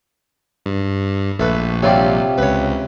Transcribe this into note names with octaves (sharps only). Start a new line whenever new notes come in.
G2
A#1 A3 B4
C3 F#3 G3 F4 G4
C#2 B4 C#5